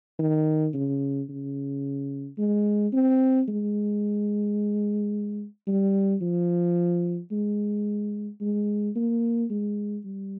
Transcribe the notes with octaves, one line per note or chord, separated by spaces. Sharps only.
D#3
C#3
C#3
G#3
C4
G#3
G3
F3
G#3
G#3
A#3
G#3
G3